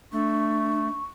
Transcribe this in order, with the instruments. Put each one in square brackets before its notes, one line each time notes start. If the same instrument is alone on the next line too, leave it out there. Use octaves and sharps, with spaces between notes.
[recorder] A3 [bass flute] D4 [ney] C#6